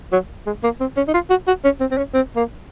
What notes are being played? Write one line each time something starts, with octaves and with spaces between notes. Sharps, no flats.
F#3
G#3
A#3
C4
C#4
D#4
F4
F#4
F#4
C#4
C4
C4
C#4
C4
A#3